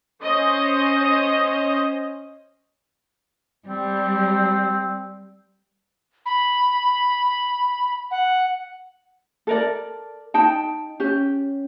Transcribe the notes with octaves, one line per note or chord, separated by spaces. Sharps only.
C#4 C5 D#5
G3 C4
B5
F#5
A4 A#4 D5
D#4 G5 A5
C#4 G4